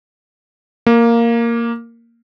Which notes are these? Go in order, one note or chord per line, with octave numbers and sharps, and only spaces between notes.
A#3